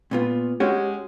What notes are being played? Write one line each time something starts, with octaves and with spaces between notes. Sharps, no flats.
A#2 B3 F4
G#3 C#4 F#4 G4 C#5 F#5